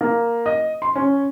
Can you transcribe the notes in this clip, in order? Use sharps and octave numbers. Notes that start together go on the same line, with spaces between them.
A#3
D#5
C6
C#4